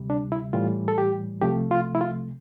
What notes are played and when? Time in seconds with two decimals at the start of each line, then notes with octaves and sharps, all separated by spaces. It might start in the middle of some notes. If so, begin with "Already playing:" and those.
Already playing: D2 C3 G3
0.10 D4
0.32 E4
0.53 A2 E3 G3 F4
0.88 A4
0.98 G4
1.41 C2 C3 F3 A3 G4
1.71 F4
1.95 E4
2.01 F4